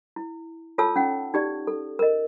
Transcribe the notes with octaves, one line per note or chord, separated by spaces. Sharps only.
E4
F4 A4 C#5 A5 E6
C#4 D#4 F#5
D#4 G4 D5
A4
A#4 D#5